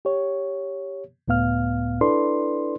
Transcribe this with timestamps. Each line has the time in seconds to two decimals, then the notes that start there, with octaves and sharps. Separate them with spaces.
0.05 G4 C#5
1.28 C#2 A2 B3 F5 F6
2.01 D4 E4 A4 B4 D5 C6